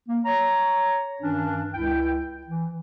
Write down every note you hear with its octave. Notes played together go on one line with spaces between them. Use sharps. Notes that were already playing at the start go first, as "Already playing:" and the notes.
A#3
C#5 A#5
G2 D#3 E3 C#4 D4
C#2 E4 G5
E3